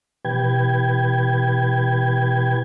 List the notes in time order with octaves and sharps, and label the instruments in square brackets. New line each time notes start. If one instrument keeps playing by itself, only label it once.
[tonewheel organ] B2 E3 G4 B4 G5 G#6